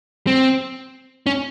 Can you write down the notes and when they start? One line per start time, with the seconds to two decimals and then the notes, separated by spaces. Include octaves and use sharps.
0.27 C4
1.27 C#4